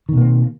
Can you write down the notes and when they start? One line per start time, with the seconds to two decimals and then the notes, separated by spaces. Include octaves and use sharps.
0.09 D#3
0.13 B2
0.17 A#3
0.22 C4